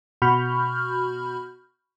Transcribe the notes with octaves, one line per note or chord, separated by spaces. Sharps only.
B2 F#4 B5 C#6 F6 G6